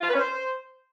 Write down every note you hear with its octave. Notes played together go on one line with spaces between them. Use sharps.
F4
B4
C#4
C5